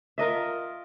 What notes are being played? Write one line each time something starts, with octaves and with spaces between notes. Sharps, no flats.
F4 A#4 D#5 E5